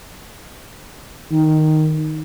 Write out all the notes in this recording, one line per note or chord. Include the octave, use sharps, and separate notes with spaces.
D#3